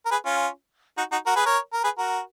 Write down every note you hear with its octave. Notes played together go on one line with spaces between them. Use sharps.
A#4
G#4 B4
C#4 F4
D#4 F#4
D#4 F#4
F#4 A#4
G#4 B4
A#4 C#5
A#4
G#4 B4
F#4 A#4